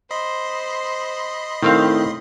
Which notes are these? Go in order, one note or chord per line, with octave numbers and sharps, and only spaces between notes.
C5 D#5 B5 C6
A2 D#3 C4 F5